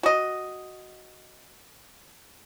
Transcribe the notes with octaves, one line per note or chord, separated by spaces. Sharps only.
F#4 D#5